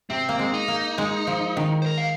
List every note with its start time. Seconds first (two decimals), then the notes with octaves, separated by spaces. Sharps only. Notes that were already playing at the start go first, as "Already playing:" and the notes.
0.10 C3 C4
0.29 A#3
0.39 G#3
0.54 D#4
0.68 A#3
0.98 G#3
1.27 F3
1.57 D#3
1.82 C5
1.86 A#4
1.98 F5